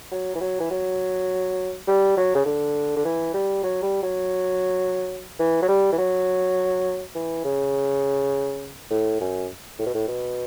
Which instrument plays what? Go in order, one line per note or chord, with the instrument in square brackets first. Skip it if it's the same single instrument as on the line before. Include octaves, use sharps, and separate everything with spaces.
[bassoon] F#3
E3
F#3
E3
F#3
G3
F#3
C#3
D3
D3
E3
G3
F#3
G3
F#3
E3
F#3
G3
E3
F#3
E3
C#3
A2
F#2
A2
B2
A2
B2